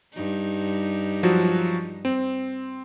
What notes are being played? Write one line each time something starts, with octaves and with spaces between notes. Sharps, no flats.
G2 D#4
F3 F#3 F#4
C4